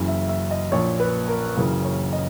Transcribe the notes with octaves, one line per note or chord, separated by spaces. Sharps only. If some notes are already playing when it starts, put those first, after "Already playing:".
Already playing: F#1 F#2 C#3 E3
E5
E5
D#5
A#1 A#2 C#5
B4
A#4
F#1 F#2 C#3 E3 A#4
C#5
D#5